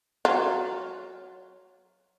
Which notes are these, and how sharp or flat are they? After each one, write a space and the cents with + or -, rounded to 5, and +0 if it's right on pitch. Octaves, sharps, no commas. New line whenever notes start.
F#3 +0 F4 +0